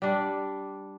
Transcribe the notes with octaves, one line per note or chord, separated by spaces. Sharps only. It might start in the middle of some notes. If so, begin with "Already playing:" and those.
G3 D4